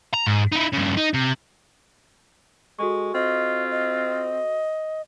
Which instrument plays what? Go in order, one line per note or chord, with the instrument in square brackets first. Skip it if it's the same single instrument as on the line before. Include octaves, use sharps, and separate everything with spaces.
[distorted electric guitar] A#5
G#2
D#4 E4
G2 C#3
D#4
C3
[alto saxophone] G#3 [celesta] F#4 A4 C#6
[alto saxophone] C4 [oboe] F4 [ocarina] D#5
[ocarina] D#5